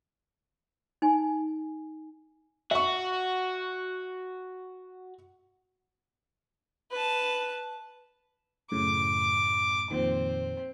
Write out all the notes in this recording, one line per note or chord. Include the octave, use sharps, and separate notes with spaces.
D#4 G#5
F#4 E5 C#6
B4 A5
F#2 A2 C#3 D6
F2 A#2 D#3 C4